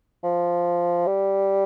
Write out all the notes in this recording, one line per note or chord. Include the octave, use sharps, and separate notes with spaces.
F3
G3